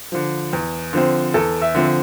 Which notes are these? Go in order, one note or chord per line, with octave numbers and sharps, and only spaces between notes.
D3 F3
E2
D3 F3 C4
E2 A4
E5
D3 F3 C4